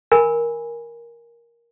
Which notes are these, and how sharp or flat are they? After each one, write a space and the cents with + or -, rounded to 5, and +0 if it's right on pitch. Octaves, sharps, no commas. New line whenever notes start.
A#4 +10 G#5 -10 B5 +0